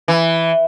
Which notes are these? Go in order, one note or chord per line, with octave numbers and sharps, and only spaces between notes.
E3